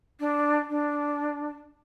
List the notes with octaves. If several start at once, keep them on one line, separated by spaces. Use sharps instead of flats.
D4
D4